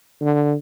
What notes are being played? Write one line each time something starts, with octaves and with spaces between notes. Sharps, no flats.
D3